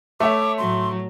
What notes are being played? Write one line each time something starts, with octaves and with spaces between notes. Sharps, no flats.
A3 C#5 E5 D6
A2 F#3 C6